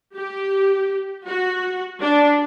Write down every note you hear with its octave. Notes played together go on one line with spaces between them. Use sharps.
G4
F#4
D4